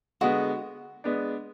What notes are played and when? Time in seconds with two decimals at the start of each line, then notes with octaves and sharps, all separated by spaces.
0.21 D3 G#3 B3 F#4
1.04 G#3 B3 D4